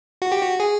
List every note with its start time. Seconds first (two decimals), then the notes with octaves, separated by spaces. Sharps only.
0.22 F#4
0.32 G4
0.43 F#4
0.60 G#4